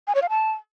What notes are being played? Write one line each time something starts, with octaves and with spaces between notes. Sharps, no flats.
G#5
C#5
F5
A5